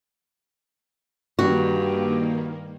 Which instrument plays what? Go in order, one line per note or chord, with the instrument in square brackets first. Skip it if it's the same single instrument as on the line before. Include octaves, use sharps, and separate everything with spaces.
[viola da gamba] G2 [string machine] D#3 A#3 [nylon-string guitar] F#4